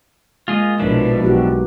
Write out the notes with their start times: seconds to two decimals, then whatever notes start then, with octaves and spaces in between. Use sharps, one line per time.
0.48 G#3 A#3 F4 G#4 D#5
0.79 A#1 B2 F3 D4 E4 A#4 B4
1.23 B1 D#4 F#4 G4